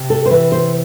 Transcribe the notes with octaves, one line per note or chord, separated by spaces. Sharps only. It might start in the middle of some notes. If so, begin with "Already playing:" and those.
Already playing: C3
A4
C5
E3 B4
C5